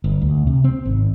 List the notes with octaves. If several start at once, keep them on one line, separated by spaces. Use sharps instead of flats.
G1
D2
C3
C4
G#1